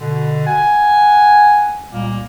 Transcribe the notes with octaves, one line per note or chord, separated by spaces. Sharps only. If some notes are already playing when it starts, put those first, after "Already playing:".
B2 D3
F#5 G#5
C#2 A#2 G3 A#3